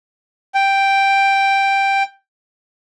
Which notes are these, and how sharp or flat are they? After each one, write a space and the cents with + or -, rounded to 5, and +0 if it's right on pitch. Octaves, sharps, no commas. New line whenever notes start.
G5 +0